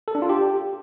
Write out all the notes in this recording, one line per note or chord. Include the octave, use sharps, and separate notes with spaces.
A4
D4
F4
G4